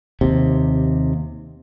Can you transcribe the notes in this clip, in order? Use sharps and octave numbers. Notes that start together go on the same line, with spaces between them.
D#2 C3